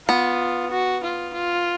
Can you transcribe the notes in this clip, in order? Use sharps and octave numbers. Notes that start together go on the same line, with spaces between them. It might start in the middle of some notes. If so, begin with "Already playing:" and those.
B3 F4
F#4
F4
F4